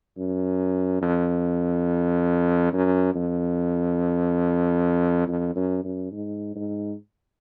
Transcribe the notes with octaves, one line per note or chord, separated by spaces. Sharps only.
F#2
F2
F#2
F2
F2
F#2
F#2
G#2
G#2